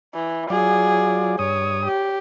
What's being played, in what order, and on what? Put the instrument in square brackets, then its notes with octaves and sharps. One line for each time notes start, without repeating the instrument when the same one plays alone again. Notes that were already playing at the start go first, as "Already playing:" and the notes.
[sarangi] E3
[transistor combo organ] F#3 F4 D5 [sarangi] G#4
[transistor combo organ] G2 D#6 [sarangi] C#5
[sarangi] G4